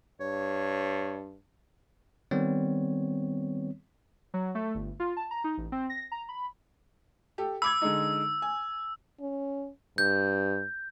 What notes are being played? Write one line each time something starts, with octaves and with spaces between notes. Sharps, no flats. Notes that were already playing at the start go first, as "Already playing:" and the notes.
G2 C#5
D#3 G3 B3 C4 C#5
F#3
A3
G1
F4
A5
A#5
D#4
A1
C4
A#6
A#5
B5
G4 A4
B5 D6 E6 G#6
D3 G#3 D#4
G#5
C#4
G2 G6